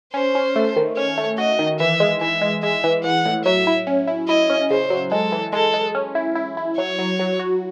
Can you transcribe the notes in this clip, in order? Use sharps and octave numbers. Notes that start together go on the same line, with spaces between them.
C#4 C5
C#4
A3
D#3
C#4 C#5
A3
F#4 D#5
D#3
E3 E5
G#3
E3 E5
G#3
G#3 E5
E3
E3 F#5
A2
F#3 E5
E4
C#4
E4
E4 D#5
C#4
C#3 C5
F#3
G#3 A4
E3
G#3 A4
G#3
C#4
E4
E4
E4
F#3 C#5
F#3
F#3
F#4